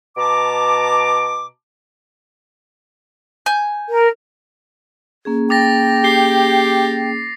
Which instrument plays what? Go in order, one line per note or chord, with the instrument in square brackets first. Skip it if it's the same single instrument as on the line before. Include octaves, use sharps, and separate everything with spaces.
[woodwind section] B2 A5 A#5 D6
[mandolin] G#5 G6
[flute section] A#4
[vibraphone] A#3 C#4 G#4
[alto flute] G5 [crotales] D6 A6 A#6
[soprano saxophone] G4 [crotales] C7